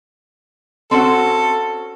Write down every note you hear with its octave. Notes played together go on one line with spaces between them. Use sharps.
C4 C#4 F#4 A4